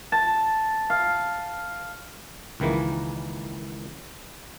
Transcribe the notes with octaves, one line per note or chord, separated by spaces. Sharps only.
A5
F5
C#2 D#3 E3 G#3 A#3